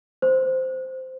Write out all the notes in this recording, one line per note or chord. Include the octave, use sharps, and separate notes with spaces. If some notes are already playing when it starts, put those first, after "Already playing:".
C5